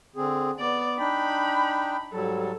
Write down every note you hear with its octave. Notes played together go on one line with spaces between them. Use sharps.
D3 C4 G#4
B3 D5
D4 D#4 G5 B5
G#2 F#3 G3 A4